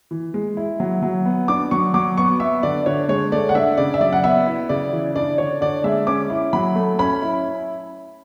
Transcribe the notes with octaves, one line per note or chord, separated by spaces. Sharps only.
E3
G#3
E4
F#3
F#3
B3
D4 D6
F#3 C#6
F#3 D6
B3 C#6
B3 E5
D3 D5
D3 C#5
G#3 C#5
A3 D5
F#5
D4 E5
C#3 D5
E5
F#3 D5
F#5
B3 E5
E4
C#3 D5
E3
D4 D5
D3 C#5
D3 D5
G#3 E5
C#4 D6
E4
F#3 B5
A3
C#4 B5
E4